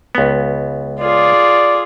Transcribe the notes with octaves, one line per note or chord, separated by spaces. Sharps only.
C#2 B3
F4 G#4 D5